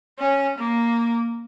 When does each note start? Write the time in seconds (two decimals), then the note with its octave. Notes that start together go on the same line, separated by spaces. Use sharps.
0.19 C#4
0.58 A#3